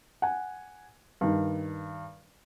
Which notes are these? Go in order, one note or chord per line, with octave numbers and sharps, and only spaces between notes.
F#5 G#5
G2 D#3